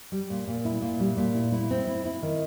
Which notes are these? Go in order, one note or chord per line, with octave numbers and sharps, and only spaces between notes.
G3
A#2
A#2
E4
A#2
G3
A#2
E4
E4
C4
E4
E4
D#3